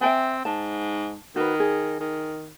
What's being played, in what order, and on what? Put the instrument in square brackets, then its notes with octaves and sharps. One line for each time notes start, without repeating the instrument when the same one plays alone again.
[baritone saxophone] C4 [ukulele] E5 G5 G#5
[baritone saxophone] G#2 [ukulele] A5
[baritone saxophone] D#3 [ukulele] F#4 B4
[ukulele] G#4
[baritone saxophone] D#3